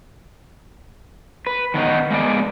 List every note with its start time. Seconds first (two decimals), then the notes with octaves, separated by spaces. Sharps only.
1.47 B4
1.74 D#3 B3 C#4 D#4
2.10 G#3 A#3 B3 D5